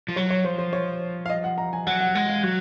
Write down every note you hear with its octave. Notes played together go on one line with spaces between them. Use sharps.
F3
F#3 C#5
C#5
F3 C5
C5
C#5
F5
D#5
F#5
A#5
G#5
F#3 F#5
F#5
G#3 F#5
F5
F#3 F#4